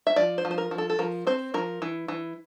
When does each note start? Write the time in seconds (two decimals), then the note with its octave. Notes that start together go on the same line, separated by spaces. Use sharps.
0.07 E5
0.16 F3 D5
0.38 C5
0.45 F3
0.51 C5
0.58 A#4
0.71 F3
0.78 A4
0.90 A4
0.99 F3 A#4
1.27 C4 C5
1.54 F3 A#4
1.82 E3
2.08 E3